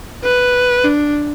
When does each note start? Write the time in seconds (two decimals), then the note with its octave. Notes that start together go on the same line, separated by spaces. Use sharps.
0.24 B4
0.84 D4